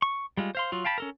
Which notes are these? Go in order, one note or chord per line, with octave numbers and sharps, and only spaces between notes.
C#6
G3 G#3 F4
C5 F5 C6
F#3 F4
F5 G5 A5 B5
C#4 A4 A#4